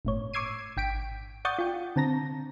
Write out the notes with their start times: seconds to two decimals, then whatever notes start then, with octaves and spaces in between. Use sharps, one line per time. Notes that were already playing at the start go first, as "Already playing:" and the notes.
0.05 G1 A2 C#5
0.33 C#6 D6 E6 G#6 C7 D#7
0.77 G#1 G5 B6 D7
1.45 D5 F#5 C#6 D#6 G6 A6
1.58 F4 G5
1.96 D3 C4 A5 A#5 A#6